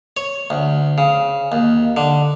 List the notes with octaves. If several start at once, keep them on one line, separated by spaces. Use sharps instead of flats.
C#5
D2
C#3
D#2
D3